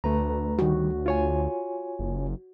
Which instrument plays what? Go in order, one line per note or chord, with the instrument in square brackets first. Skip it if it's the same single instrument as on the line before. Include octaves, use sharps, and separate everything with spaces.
[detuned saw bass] D2 [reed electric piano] A3 B4 A#5
[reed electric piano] D#3 G3 [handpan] F#4
[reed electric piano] F4 C#5 G#5
[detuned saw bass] F#1